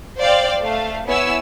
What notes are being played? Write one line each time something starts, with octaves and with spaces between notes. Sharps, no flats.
C5 D5 F5 G5
A3 F5
B3 E4 C#5 G#5 E6